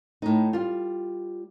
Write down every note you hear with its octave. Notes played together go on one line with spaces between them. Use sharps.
A2 D#4
G3 F4